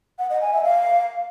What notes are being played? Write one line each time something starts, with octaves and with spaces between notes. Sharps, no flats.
F#5
D#5
G#5
E5
F5